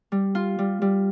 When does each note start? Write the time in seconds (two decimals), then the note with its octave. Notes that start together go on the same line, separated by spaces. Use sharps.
0.12 G3
0.35 F4
0.59 G3
0.82 G3